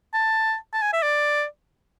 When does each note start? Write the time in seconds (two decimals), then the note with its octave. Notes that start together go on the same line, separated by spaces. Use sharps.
0.13 A5
0.73 A5
0.82 G#5
0.93 E5
1.03 D5